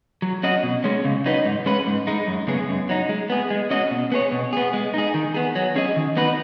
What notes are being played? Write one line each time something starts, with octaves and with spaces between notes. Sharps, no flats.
F#3
C#4 F#4 D#5
B2
G#3 C#4
C#3
F#3 D#4 B4 D#5
G#2
G#3 C#4 B4
G#2
G#3 D#4
F#2
C#3 G#3 B3 G#4
F#2
F#3 D#4
G#3
B3 G#4
G#3
C#4 F#4 D#5
B2
B3 G#4 C#5
B2
B3 G#4
G#3
D#4 G#4
D#3
B3 G#4
F#3
C#4 G#4 D#5
D#3
B3 D#4 F#4 B4